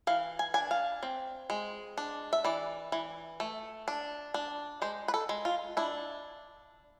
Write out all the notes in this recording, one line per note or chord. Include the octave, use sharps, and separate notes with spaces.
E3 F5
G#5
D4 G#5
F5
C4
G#3
D4
E5
E3 D5
E3
A3
D4
D4
G#3 C5
B4
A4
G#3
F4
D4 E4